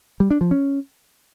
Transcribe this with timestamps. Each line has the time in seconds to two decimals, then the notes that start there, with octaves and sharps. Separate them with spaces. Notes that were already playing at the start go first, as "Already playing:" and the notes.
0.20 G3
0.31 D4
0.41 F3
0.51 C#4